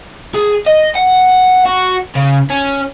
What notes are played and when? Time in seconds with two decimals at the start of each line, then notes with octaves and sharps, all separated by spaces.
0.34 G#4
0.66 D#5
0.95 F#5
1.65 F#4
2.15 C#3
2.50 C#4